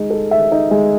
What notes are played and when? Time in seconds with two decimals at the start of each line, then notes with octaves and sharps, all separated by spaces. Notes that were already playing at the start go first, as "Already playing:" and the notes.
Already playing: G#3 D#4
0.10 A4
0.31 E5
0.52 D#4
0.71 G#3